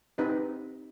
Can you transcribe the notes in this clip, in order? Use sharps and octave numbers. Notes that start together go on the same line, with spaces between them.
C4 D#4 G4 B4 D#5